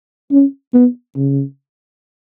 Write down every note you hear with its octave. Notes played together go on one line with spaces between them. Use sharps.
C#4
B3
C#3